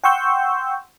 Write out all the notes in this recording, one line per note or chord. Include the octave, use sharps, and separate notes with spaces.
F#5 G5 C6 C#6 E6 G6